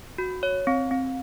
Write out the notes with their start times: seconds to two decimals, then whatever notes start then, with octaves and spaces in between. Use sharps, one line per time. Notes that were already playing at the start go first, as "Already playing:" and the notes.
0.18 F#4
0.43 C#5
0.67 C4
0.91 C4